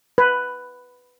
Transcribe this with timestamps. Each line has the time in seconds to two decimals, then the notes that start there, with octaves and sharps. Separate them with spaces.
0.18 B4